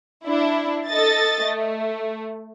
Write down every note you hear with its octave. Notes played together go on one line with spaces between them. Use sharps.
D4 E4
A4 D#5 A6
A3